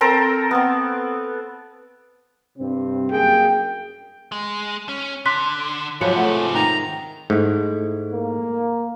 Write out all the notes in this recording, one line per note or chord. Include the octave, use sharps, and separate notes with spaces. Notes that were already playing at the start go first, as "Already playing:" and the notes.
C4 A4 A#4 C5
B3 C4
G2 C3 C4
F#2 A#3 G#4 G5
G#3
C#4
D3 C6 F#6 B6
G#2 C3 F3 F#3 G#3 B4 C#7
A3 F#5
D#3 A#5
G#2 A3 E4
A#3